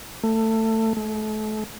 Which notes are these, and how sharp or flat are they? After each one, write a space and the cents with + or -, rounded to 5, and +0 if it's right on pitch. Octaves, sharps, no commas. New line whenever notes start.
A3 +20
A3 -35